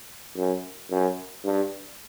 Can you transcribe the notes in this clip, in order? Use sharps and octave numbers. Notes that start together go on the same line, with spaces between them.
F#2
F#2
G2